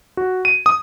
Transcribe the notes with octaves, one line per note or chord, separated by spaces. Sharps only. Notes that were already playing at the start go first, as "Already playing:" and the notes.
F#4
D#7
D#6